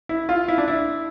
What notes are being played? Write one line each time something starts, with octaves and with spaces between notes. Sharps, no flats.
E4
F4
E4
D4
E4